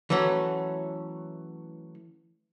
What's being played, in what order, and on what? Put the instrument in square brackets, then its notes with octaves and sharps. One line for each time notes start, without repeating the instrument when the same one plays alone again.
[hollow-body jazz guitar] E3 F#3 A3 C#4